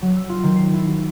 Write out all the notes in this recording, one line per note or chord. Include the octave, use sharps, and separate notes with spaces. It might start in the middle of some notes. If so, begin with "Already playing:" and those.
F#3
E6
F4
D#3
C7
E4
F#4